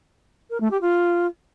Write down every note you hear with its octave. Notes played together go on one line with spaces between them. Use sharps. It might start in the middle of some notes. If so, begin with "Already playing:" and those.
A#4
A3
G4
F4